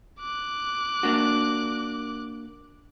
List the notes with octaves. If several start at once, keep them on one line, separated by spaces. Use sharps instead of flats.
D6 F#6
A#3 D4 F#4